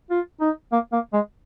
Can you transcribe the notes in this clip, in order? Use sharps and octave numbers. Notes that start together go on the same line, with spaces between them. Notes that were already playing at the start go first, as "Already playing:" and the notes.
F4
D#4
A#3
A#3
G#3